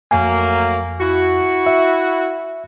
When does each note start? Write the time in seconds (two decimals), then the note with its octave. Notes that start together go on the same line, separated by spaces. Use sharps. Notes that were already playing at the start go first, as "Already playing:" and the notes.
0.11 F2 F#3 A3 A#3 G#5
1.00 E4 F#4
1.66 E5